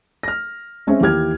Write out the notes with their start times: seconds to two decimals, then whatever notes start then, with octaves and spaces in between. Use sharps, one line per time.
0.23 F6 A#6
0.87 G#3 C4 C#4 G#4 E5
1.01 D#2 E3 G4 F6 G#6